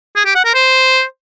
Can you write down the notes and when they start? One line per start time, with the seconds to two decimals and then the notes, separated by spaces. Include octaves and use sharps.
0.16 G#4
0.25 G4
0.35 F#5
0.45 A#4
0.54 C5